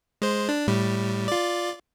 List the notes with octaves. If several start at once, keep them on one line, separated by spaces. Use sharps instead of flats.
G#3 C5
D4
A2 G3
F4 D5